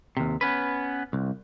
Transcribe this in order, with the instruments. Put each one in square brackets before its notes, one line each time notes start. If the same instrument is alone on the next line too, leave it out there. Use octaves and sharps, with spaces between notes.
[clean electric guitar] D#2 C3
B3 C#4 B4
C2